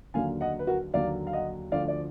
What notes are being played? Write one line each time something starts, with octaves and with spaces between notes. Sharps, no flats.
D#2 D3 F#3 A#3 F5 G#5
D#5 F#5
B4
F#4 A#4
D#2 D3 F#3 A#3 D5 F5
F5
D#5 F#5
D2 D3 F3 D5 F5
D5